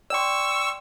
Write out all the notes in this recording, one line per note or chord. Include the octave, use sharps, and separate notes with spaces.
D5 G5 C6 C#6 E6